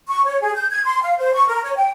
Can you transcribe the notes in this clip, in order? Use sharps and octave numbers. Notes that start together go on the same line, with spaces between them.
C#6
C#5
G#4
G6
G#6
C6
F5
C5
C#6
A#4
C#5
G5